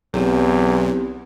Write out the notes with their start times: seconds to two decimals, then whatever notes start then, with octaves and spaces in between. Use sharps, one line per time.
0.14 B1 E2 B3 C4 G4